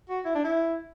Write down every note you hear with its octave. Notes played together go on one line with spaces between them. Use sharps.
F#4
E4
D4
E4